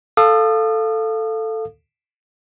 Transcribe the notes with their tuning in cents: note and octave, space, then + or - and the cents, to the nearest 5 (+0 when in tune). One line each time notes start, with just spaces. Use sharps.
A4 +5 F5 +0 D#6 -35